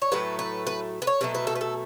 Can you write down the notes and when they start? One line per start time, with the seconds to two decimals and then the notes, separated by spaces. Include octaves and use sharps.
0.02 C#5
0.12 A2 F#3 A3 B4
0.39 B4
0.67 B4
1.02 B4
1.07 C#5
1.21 B2 F#3 A3 B4
1.35 B4
1.47 A4
1.55 B4
1.61 A4